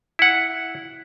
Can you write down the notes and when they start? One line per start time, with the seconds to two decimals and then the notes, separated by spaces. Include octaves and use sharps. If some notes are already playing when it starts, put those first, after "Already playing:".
0.19 E4 F#5